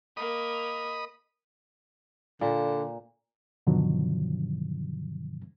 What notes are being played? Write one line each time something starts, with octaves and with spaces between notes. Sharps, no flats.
A#3 D#5 B5 D#6
A#2 D3
G2 B2 D3 D#3 F3 F#3